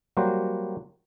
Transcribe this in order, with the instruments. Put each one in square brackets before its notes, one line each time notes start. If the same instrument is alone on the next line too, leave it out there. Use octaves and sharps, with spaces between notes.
[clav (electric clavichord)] F#3 G3 A#3 F#4 C5